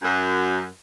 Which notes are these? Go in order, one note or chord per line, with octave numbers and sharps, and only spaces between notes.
F#2